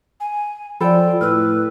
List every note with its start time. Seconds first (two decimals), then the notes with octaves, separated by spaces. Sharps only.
0.20 G#5
0.81 F3 F4 A4 D5 G5 B5
1.21 A2 B4 E6 F6